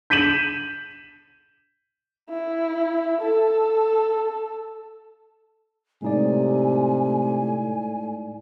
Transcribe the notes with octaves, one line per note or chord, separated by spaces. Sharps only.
G6 B6 D#7 E7 F#7
E4
A4
A2 C3 G#3 D#4 D5 G#5